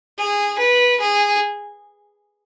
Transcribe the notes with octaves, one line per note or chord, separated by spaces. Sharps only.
G#4
B4
G#4